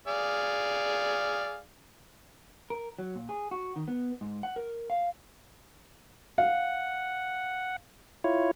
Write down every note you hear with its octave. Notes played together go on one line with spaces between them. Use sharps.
G#4 D5 F5
A#4
F#3
A#2
G#4
F#4
D#3
B3
G#2
F#5
A#4
F5
F5 F#5
E4 F4 C#5